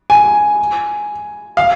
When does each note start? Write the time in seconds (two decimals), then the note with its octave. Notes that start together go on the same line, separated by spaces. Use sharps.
0.10 G#5
1.57 F5